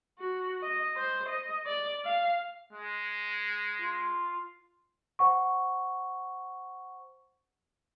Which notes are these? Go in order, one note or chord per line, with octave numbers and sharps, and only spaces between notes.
F#4
D#5
C5
D#5
D5
F5
G#3
F4
C5 F#5 C#6